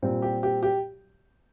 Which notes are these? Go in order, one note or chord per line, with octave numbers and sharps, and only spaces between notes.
A#2 G3 C4
G4
G4
G4